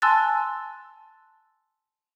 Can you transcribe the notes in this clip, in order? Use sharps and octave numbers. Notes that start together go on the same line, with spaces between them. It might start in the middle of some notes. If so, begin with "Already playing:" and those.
G#5 A5 C6 E6 F#6 A6